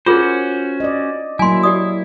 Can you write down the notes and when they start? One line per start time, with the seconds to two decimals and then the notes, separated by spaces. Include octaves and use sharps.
0.06 C#4 F4 F#4 G#4 A#4 C5
0.80 D5 D#5
1.39 F#3 A#3 E4 G#5 C6
1.63 G4 D5 D#6